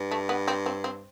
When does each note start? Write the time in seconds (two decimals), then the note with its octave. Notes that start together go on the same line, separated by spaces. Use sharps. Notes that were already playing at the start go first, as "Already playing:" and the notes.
Already playing: G2
0.11 A3
0.29 B3
0.48 C4
0.66 C4
0.84 C4